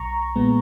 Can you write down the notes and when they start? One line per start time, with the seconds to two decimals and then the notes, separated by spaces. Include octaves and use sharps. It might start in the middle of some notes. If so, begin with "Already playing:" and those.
Already playing: B1 A#5 C#6
0.36 A#2 G#3 B3